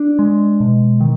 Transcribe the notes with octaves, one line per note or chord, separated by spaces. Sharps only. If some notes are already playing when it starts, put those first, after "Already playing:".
Already playing: D4
G#3
B2
D#3